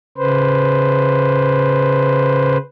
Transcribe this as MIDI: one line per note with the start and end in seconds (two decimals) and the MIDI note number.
0.18 2.58 49
0.18 2.58 71
0.18 2.58 72